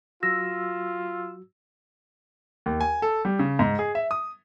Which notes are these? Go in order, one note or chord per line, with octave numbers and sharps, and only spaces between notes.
F#3 F4 F#4 E6 A#6
D#2
G#5
A4
G3
C#3
G#2
G#4
E5
D#6